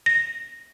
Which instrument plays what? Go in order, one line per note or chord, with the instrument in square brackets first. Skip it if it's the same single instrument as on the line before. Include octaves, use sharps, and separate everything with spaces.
[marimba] A#6